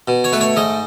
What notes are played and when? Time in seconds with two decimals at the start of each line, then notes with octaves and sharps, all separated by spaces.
0.08 B2
0.24 C#5
0.32 A3 B4
0.41 C#5
0.56 G#2 D#5